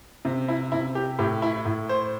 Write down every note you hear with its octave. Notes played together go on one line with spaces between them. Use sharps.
C3
E4
C3 E4
G4
A2 G4
E4
A2
C5